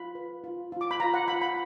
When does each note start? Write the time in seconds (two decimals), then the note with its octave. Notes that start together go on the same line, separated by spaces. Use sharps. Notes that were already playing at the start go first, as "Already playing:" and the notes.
Already playing: F4 B5
0.15 B4
0.44 F4
0.72 F4
0.81 D6
0.91 B5
1.00 F4 A#5
1.14 F#5
1.28 F4 B5
1.42 B5